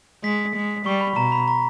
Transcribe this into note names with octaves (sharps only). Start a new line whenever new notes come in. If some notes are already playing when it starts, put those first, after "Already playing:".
G#3 B6
G#3
G3 C#6
B5
B2 A#5
B5
A#5